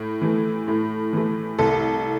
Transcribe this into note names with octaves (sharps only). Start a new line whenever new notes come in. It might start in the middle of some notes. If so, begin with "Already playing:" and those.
Already playing: A2
E3 A3
A2
E3 A3
C2 A4